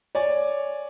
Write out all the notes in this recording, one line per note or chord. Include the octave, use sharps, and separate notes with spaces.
C#5 D5 G#5